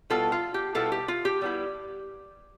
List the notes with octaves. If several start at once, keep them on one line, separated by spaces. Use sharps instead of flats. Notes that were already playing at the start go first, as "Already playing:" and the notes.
B2 G3 B3 E4 F4 A4
F4
G4
B2 G3 B3 E4 F4 A4
G4
F4
G4
B2 G3 B3 E4